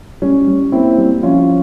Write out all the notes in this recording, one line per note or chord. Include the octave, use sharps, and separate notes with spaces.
G3 C#4
G3
A#3 C4 E4
G3
F3 C#4 F4